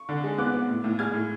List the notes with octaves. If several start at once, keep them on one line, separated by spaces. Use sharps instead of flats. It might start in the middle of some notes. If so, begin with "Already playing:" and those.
Already playing: C#6
D3
G#3
B3 D6 F#6
B3
A2
A2
G#3 F6 G#6
A2